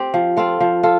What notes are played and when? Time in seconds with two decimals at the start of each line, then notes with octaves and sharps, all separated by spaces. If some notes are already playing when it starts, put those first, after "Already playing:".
Already playing: C4 G4
0.14 F3
0.37 C4 F4 A4
0.61 F3
0.83 F4 A4